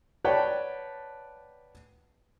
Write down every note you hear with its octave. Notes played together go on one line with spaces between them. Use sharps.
B4 C#5 D5 F#5 G5 A5